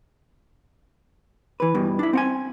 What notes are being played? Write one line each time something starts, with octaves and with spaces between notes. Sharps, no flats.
E3 B4
G2 B2 E3
D4 E4
C4 F#5 G#5